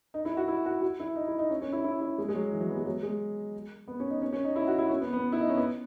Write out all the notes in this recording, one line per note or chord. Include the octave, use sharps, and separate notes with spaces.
D#4
E4
F#4
E4
F#4
F#4
E4
D#4
E4
D#4
C#4
C#4
E4
E4
E4
G#3
G#3
F#3
E3
F#3
B3
G#3
F#3
G#3
B3
C#4
D#4
C#4
C#4
D#4
E4
F#4
E4
C#4
B3
B3
E4
D#4
C#4
B3